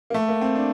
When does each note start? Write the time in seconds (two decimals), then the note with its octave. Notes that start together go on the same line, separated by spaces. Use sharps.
0.10 A#3
0.14 A3
0.29 A#3
0.41 C4
0.55 D4